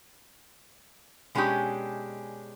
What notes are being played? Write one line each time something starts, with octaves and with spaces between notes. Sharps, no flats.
B2 G#3 C#4 D4 G4